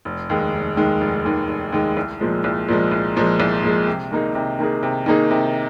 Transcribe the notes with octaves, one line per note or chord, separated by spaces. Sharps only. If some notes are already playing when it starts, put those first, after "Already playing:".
F1
D#2 D#3 G#3
F1
D#2 D#3 G#3
F1
D#2 D#3 G#3
F1
D#2 D#3 G#3
C2
A#2 F3 G#3
C2
A#2 F3 G#3
C2
A#2 F3 G#3
C2
A#2 F3 G#3
C3
D#3 A#3 D#4 G#4
C3
D#3 A#3 D#4 G#4
C3
D#3 A#3 D#4 G#4
C3